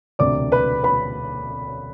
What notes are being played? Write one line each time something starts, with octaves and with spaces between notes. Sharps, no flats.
E1 D2 C3 D5 D6
B4 B5
B4 B5